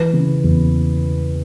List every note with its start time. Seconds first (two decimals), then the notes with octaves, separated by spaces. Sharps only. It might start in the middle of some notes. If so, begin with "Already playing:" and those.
Already playing: E3 B4
0.13 C#3
0.44 E2